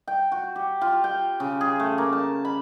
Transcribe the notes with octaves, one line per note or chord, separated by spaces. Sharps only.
G5
F#4
G4
F4
G5
C#3
G#4
A3
A#3
A5
B5